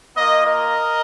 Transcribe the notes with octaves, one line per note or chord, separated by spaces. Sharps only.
A#3 F4 A#4 D#5
A#4 D#5